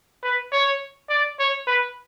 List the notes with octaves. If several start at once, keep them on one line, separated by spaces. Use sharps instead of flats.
B4
C#5
D5
C#5
B4